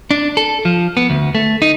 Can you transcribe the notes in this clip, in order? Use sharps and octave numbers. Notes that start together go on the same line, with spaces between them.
D4
A4
F3
B3
D2
A3
D#4